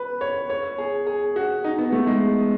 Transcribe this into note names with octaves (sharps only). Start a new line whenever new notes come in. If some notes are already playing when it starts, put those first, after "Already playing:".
Already playing: B4
C#5
C#5
G#4
G#4
F#4
D#4
B3
A3
G#3